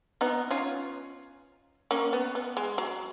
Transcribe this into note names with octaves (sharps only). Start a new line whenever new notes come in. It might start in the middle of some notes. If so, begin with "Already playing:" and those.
B3 D#4
C#4 F4
A#3 C#4
B3
B3
G#3
F#3